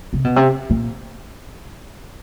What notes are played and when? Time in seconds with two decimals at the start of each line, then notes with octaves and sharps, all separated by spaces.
0.13 C3
0.24 B2
0.36 C3
0.70 A#2